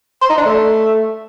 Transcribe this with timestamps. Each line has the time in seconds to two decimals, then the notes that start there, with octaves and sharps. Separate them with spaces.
0.22 C5
0.30 D#4
0.38 D4
0.46 A3